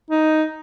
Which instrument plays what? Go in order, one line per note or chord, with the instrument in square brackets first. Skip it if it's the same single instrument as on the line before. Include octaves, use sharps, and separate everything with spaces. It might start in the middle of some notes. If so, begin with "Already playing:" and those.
[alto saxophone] D#4